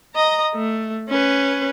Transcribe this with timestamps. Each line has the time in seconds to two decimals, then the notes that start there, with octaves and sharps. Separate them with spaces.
0.15 D#5 A#5
0.55 A3
1.09 C#4 B4